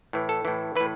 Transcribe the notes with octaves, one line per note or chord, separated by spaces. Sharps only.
A2 E3
A4
A2 E3
A2 E3 B4